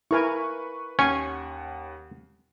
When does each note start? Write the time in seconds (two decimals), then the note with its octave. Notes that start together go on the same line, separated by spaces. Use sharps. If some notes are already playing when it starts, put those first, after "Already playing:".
0.11 E4 A#4 B4 G#5 C#6
0.99 D#2 C#4 F#5 G#5 C#6 C7